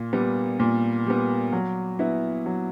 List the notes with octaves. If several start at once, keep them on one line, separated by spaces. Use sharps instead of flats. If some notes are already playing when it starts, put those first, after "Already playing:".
Already playing: A#2
G3 B3
A#2
G3 B3
F#3
B3 E4
F#3